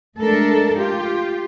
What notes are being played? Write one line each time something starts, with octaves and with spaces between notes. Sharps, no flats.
G#3 A3 D4 A4 A#4
F4 G4